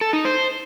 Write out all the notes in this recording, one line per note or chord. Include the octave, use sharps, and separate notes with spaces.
A4
D#4
C5